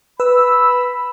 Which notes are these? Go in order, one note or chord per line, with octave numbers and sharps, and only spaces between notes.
B4 B5 E6